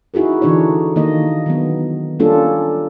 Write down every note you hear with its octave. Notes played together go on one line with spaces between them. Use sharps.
D#4 E4 F#4 G#4 A#4
D3 E3 D4 D#4 C#5
D#3 A#3 D#5
D#3 F#3 B3
G3 A#3 C#4 D4 F4 A4